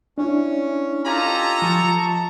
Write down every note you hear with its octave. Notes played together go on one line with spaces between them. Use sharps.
C#4 D4 E4
F4 G4 A4 D#5 G#5 A#5
F3 A5 C#6